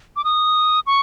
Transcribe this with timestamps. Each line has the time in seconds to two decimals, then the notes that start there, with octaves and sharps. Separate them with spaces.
0.16 D6
0.24 D#6
0.87 C#6